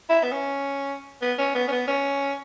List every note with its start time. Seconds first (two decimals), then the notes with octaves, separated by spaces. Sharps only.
0.09 E4
0.23 B3
0.32 C#4
1.22 B3
1.39 C#4
1.55 B3
1.68 C#4
1.72 B3
1.88 C#4